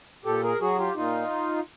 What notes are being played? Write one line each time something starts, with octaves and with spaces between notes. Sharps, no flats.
A#2 G4 A4
G#4 A#4
F#3 F#4 G#4
F4 G4
A#2 D#4 F4